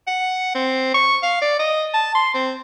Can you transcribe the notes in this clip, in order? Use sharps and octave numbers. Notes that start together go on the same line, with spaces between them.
F#5
C4
C#6
F5
D5
D#5
A5
C6
C4